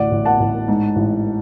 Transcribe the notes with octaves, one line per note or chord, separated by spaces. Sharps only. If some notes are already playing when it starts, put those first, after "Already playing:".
Already playing: A1 D2 D5 F#5
A1
F#5 A5
A1
G#2
A1